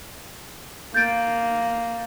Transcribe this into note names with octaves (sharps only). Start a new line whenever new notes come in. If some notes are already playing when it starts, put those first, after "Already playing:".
A#3 G6 A6 D7